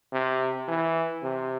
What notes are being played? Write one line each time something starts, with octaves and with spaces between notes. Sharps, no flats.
C3
E3
C3